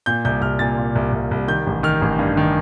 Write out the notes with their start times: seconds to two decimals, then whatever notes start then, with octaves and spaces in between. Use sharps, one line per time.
0.06 A#2 G6
0.25 C2 G6
0.42 C2 F6
0.59 A#2 A6
0.78 A#2
0.95 C2
1.12 C2
1.31 C2
1.48 D#3 G6
1.67 A1
1.83 D#3 F6
2.02 A1
2.19 G2
2.37 D#3